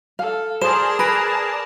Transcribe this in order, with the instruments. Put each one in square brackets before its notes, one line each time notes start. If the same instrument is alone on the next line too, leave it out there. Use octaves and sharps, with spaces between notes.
[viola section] A4 [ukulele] F5
[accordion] G#4 [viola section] A#4 D5 A5 [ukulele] C5 [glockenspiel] E7
[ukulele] B4 [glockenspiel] B5 A#6 D7